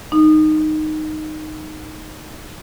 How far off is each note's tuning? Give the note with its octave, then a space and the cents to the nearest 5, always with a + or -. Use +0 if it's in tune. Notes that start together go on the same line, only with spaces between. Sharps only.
F#3 +5 D#4 -10